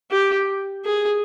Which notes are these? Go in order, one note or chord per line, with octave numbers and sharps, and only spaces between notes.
G4
G#4